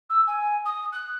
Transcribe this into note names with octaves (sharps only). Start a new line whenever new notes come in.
E6
G#5
D#6
F#6